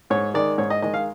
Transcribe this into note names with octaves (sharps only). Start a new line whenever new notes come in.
G#2 C#5
D#3 G#3 D5
G#2 C#5
D#5
D#3 G#3 D#5
F5